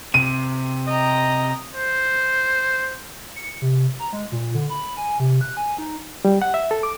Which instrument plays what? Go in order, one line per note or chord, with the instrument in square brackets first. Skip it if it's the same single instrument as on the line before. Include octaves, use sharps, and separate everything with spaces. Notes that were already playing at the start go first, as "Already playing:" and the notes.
[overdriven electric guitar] C3 [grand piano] D#7
[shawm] D#5 [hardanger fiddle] G5 A#5
[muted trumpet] C5
[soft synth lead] C#7
C3
A#5
G#3
A#2
D3
B5
G#5
C3
F#6
G#5
D#4
[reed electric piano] G3
F#5
E5
A4
D6